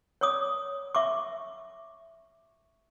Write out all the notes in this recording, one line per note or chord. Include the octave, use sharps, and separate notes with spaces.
C#5 D5 D6 D#6
E5 C#6 D6